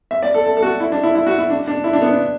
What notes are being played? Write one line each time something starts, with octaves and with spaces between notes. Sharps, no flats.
E5
D5
A4
A4
A4
F#4
E4
D4
E4
E4
F#4
E4
D4
D4
E4
D4
B3
D4